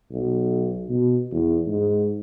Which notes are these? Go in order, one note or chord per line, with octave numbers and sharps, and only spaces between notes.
B1
B2
E2
G#2